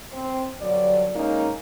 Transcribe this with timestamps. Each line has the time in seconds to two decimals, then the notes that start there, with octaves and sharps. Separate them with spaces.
0.12 C4
0.60 G2 D3 F#3 D5
1.15 G#3 A#3 C#4 D#4